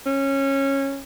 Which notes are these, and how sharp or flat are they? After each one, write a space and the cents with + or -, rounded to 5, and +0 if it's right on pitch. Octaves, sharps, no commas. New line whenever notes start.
C#4 -15